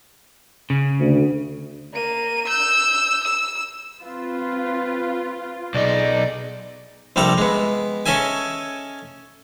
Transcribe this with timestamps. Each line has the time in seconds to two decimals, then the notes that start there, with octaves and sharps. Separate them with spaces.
0.70 C#3
1.00 D2
1.93 A#3 D#7
2.47 E6 G6
3.24 E6
4.03 C4 F4 B4
5.74 B1 B3 D#4 G#4 D5
7.16 A#1 C3 G3 A4 A#4 A#5
7.38 G#3 B3
8.06 C#4 A4 D#5 E5 G#5